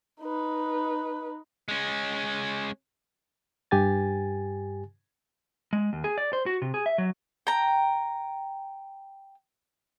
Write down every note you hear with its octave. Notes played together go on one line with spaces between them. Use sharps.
D#4 B4
G#3 C#4
G2 G4 G#5 A6
G#3
D#2
G#4
D5
C5
F#4
C3
G#4
E5
F#3
G5 A#5